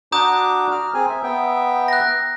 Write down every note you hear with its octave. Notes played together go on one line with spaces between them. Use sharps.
D4 F#4 A#5 D6 D#6 G6
F6
C4 G#4 G#5
E5
B3 E5 G5
F#6 A#6